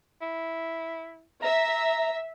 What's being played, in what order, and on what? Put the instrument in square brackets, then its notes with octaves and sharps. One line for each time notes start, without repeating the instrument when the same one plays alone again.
[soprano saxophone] E4
[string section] E5 [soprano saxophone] A#5